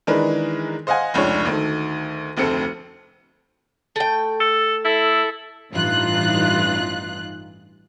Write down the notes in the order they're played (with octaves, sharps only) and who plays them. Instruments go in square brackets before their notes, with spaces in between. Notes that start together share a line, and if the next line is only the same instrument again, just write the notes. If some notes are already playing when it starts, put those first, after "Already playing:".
[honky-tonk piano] D#3 E3 G#3 D4 A#4 B4
C5 D#5 F5 F#5 G#5
F1 C#2 D4 C#5
D2 D#3 A4
F1 D2 C4 A4 C#7
[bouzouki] A3 G5
[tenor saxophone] A4
[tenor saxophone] E4 [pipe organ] A4
[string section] A1 G2 E3 D#4 F4 F#6